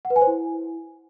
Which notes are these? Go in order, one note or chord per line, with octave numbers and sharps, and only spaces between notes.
F#5
B4
G#5
C5
E4